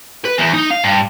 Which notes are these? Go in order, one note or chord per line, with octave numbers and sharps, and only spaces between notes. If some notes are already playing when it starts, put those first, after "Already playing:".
B4
E2
D#4
F5
G2